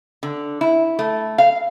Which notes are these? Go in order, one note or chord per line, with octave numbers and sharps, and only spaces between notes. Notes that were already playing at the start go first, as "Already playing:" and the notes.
D3
E4
A3
F5